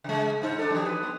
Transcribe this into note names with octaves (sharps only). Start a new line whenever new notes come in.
C#3 G#3
G#2 D#4 C5
D4 A4
F3 G3
B4
B3